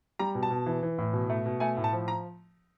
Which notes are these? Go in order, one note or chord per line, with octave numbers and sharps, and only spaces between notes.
G3 A#5
B2
A5
B2
E3
E3
A2
B2
A3
B2
A3 G#5
A2
A5
F3
A#5